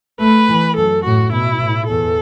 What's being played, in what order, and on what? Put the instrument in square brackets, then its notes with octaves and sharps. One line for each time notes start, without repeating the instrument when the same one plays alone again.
[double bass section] A3 [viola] B4
[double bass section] E3
[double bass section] F#2 [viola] A4
[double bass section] A2 [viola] F#4
[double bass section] B2 [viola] E4
[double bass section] A2
[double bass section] E2 [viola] A4